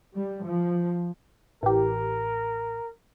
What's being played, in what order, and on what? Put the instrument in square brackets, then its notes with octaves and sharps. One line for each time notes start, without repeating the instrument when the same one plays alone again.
[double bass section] G3
F3
[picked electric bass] A1 [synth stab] E3 G4 [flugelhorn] A#4